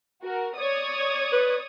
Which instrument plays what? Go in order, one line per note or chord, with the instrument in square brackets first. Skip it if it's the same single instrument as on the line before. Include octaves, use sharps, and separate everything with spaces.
[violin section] F#4 A#4
C#5 D5 D#6
[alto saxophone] B4